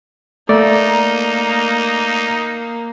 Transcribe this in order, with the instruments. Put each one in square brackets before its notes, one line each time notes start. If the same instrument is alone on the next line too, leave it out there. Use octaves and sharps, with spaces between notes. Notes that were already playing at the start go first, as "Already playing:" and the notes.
[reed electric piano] A3 D5 [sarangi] A#3 [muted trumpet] D#4